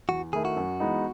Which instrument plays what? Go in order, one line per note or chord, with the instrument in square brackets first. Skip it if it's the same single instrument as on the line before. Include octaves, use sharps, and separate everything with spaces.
[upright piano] E2 [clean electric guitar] F#4
[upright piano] D#3 A3 E4 [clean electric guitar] G#4
[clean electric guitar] F#4
[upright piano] F#2
E3 G#3 B3 D#4